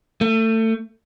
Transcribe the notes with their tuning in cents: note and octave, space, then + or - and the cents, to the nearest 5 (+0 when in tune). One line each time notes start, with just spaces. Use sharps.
A3 +25